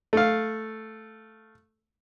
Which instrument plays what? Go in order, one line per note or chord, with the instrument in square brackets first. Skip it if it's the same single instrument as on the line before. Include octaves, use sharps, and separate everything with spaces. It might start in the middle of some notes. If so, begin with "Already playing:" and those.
[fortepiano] A3 F5